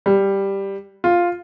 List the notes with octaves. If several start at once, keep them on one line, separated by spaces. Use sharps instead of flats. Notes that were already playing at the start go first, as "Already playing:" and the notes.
G3
F4